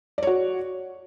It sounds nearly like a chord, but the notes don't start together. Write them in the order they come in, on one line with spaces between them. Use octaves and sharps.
D5 C#5 F#4